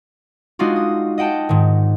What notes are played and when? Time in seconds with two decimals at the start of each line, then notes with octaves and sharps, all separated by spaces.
0.59 G#3 D4 D#4 F4 F#4
0.76 D#6
1.18 D#5 F#5 G5 A5
1.49 G#2 D#3